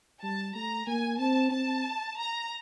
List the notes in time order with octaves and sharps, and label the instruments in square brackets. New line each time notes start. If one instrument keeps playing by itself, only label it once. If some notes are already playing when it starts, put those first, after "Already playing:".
[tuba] G3 [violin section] A5
[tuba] A3 [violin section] A#5
[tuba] A#3 [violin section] G#5
[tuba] C4 [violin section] A5
[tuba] C4 [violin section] A5
[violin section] A#5